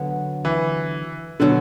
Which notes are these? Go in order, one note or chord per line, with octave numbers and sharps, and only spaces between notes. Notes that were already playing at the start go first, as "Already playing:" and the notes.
Already playing: D3 F#3 B3 F#4
E3
B2 D3 F#3